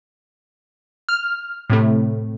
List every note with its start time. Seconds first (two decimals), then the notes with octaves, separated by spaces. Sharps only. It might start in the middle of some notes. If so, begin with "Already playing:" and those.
1.09 F6
1.70 A2 C3 A3